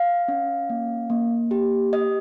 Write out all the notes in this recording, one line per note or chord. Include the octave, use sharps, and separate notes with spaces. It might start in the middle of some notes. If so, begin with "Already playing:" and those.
Already playing: F5
C#4
A#3
A#3
G4
G4 D#5